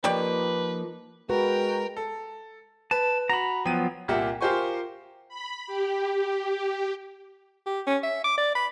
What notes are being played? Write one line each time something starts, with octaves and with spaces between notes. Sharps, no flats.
F3 A#3 D#4 G4 B4 C#5 D5
G#3 F#4 A#4 B4 G5
A4
B4 A5
F#4 A#5 B5
F3 F#3 B3 G5 D#7
C2 A#2 G4 A#4 E5 F#5
F4 G4 A#4 C5 G#5 C#6
B5
G4
G4
C#4
E5
D6
D5
B5